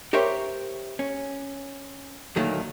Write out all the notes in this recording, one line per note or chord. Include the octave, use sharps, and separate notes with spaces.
G4 A#4 C5 C#5 E5 G5
C#4
D2 A#2 D#3 F#3 A3 A#3